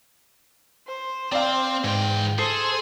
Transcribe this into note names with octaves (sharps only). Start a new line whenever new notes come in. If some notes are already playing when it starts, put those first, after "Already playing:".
C5
C4 D5 F5
G#2 E3 G5
G#4 A4 C5 C7